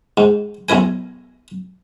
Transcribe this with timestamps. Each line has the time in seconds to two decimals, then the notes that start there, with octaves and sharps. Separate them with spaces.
0.17 G#2
0.69 B1 C#4 E4 A#4 G#5